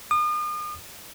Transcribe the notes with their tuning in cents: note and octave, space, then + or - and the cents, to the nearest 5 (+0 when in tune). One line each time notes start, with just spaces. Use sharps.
D#6 -40